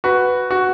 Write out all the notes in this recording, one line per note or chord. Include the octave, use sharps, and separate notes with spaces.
F#4 B4
F#4